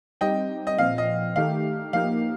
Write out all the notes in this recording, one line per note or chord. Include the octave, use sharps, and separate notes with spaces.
G3 C4 D#4 G4 D#5 G5
D#5
A#2 F3 C4 F5
D#5
D#3 A3 D#4 G4 F5
F3 A#3 D#4 G4 F5